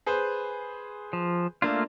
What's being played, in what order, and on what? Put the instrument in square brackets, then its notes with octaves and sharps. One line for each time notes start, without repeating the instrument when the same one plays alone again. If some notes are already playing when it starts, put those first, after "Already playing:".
[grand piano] G#4 B4 C5
[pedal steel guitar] F3
[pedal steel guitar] A3 A#3 F4 [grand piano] D4